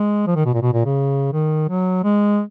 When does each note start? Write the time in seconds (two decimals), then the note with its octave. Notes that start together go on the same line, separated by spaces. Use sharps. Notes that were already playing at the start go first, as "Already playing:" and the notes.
Already playing: G#3
0.27 F3
0.36 D#3
0.45 B2
0.54 A#2
0.62 B2
0.73 A#2
0.85 C#3
1.33 D#3
1.69 F#3
2.04 G#3